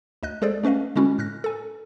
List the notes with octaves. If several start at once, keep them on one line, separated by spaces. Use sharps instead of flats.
D2 D#5 F#6
G#3 G#4 A4 C5 D5
A3 C#4 B4 D#5 F5
D3 G#3 C#4 E4 F#4
A2 F6 F#6 A#6
A4 G#5